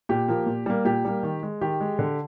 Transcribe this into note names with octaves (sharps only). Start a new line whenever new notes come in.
A#2 G4
F3 A#3
A#2
G3 A#3
A#2 G4
G3 A#3
D#3
G#3
D#3 G4
G#3
D3